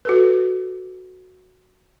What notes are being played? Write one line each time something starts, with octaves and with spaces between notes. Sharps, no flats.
F#4 A4 B4